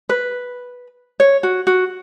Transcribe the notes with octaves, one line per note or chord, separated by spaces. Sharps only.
B4
C#5
F#4
F#4